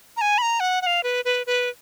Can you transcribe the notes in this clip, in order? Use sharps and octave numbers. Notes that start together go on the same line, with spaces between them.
A#5
G#5
B5
A#5
F#5
F#5
F5
B4
B4
B4